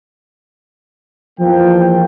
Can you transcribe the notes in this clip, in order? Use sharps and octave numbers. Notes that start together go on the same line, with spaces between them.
E2 F3 A#3 G5